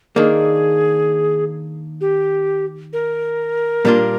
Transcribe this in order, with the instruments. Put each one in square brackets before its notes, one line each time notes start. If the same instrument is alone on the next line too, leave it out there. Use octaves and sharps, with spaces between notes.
[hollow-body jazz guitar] D#3 A#3 D4 [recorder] G#4
[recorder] G4
A#4
[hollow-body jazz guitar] A#2 G3 A#3 D4 F4